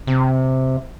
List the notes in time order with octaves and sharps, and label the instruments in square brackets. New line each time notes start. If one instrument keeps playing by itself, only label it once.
[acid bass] C3